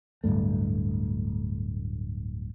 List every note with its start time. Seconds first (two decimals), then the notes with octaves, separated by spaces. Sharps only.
0.24 D1 C#2 G2 A3